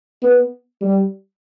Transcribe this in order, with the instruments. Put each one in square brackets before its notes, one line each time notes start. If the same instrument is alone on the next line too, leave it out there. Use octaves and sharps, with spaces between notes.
[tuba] B3
G3